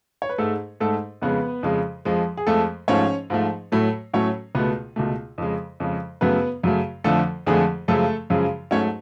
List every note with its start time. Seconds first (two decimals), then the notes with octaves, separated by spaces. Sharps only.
0.22 C#5
0.29 B4
0.38 G#2 G#3 A3 A4
0.80 G#2 G#3 A3 A4
1.22 F2 C#3 G#3 B3 B4
1.63 F2 C#3 G#3
2.05 F2 F3 G#3
2.37 G#4
2.47 F2 F3 G#3 A3 A4
2.88 G#2 F3 A3 C#4 C#5
3.30 G#2 F3 A3
3.72 A2 F#3 A3
4.14 A2 F#3 A3 C#4 C#5
4.55 C#2 B2 A3 B3 B4
4.96 C#2 B2 A3
5.38 F2 C#3 G#3
5.80 F2 C#3 G#3
6.21 F#2 C#3 F#3 A3 B3 B4
6.63 F#2 C#3 F#3 A3
7.04 F2 D3 F3 A3 A4
7.46 F2 D3 F3 G#3 A3 G#4
7.88 F#2 C#3 F3 G#3 A3 A4
8.30 F#2 C#3 F3 G#3
8.71 G#2 F#3 A3 C#4 C#5